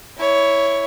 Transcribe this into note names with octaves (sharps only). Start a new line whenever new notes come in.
E4 C#5